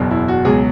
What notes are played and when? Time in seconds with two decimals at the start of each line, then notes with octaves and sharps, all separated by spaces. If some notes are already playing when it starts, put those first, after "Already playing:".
Already playing: F#1 E2 B2
0.11 E4
0.28 F#4
0.45 C#2 B2 F#3 G#4